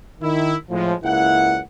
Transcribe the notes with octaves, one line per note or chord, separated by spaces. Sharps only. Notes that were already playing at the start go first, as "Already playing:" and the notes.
D#3 E4
A2 F3 G#3
C#2 A#3 E4 F#5